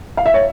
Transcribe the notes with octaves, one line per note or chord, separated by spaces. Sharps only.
F5
E5
C#5